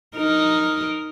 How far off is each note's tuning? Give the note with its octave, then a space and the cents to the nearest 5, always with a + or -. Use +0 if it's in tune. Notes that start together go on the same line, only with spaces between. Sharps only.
D#4 +0 A#4 +0